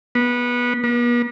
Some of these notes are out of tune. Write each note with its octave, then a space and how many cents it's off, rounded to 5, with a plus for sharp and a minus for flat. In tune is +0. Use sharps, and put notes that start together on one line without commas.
B3 -20
B3 -45